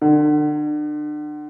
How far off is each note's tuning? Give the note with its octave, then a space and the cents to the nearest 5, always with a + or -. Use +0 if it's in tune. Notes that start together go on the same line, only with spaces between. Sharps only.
D3 +35